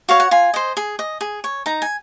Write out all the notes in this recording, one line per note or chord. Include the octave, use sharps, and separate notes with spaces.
F#4 C#5 F5
F#5
F4 G#5
C5 D#5
G#4
D#5
G#4
C#5
D#4 A#5
G#5